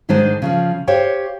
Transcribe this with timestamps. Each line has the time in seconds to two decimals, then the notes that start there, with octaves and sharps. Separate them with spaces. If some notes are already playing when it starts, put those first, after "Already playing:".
0.09 G#2 D#3 G#3 D4 C5 D#5
0.42 C#3 E3 F3
0.87 G4 C5 C#5 F5 G5